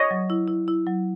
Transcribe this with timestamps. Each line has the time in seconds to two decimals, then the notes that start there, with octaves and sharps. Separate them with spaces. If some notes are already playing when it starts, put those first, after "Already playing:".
Already playing: C#5 D#5
0.11 F#3
0.30 E4
0.48 E4
0.68 E4
0.87 F#3